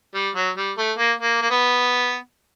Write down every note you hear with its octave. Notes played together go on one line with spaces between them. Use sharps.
G3
F#3
G3
A3
A#3
A#3
A#3
B3